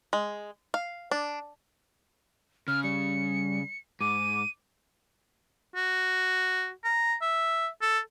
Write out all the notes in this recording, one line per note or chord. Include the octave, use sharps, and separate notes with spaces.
G#3
F5
D4
C#3 F6
G3 C#7
G#2 D6 D#7
F#4
A#5
E5
A4